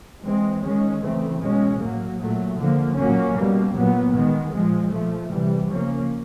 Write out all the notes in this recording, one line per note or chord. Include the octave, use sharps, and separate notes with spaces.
E3 G#3 C4
D#3 G#3 C#4
C#3 E3 A3 C4
B2 G#3 C#4
A2 F#3 A#3
A#2 F#3 A3
D3 F3 A#3
A#2 F#3 A#3 C#4
B2 G3 A#3
A#2 F#3 B3
D#3 G#3 B3
A#2 F3 G#3
A#2 F3 A3
C3 E3 G3
C#3 F3 A#3 C#4